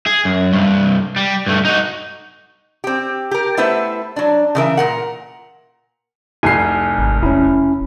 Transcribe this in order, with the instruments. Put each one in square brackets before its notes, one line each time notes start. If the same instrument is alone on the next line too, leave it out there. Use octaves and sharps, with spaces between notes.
[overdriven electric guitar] G#4
F#2
C2 G2
G3
G2 A3
D#4 F#4
[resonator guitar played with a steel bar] C4 G4
G4 A#4
A3 B3 E4 B4 C5 E5
F#3 D4
C#3 E3 A#4 E5
A#2 A#4 F#5
[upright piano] F1 C2 C7 [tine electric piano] G#5
[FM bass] G#1
[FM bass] E1 [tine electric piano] C#4 E4